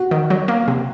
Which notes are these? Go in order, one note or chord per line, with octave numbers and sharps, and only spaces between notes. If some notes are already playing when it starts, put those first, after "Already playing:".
Already playing: F#4
D#3
F#3
A#3
C3